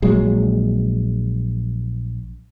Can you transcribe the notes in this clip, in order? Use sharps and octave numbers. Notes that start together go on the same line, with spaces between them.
A#1 F#3 G#3